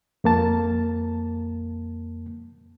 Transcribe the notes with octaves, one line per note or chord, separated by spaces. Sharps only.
F2 A#3 A5